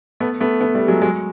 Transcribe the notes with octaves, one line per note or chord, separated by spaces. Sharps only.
A3 B3
A3 B3
A3 B3
G3 A3
F#3 G#3
F#3 G#3